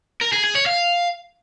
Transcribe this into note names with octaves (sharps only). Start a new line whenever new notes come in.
A#4
G#4
G#4
C#5
F5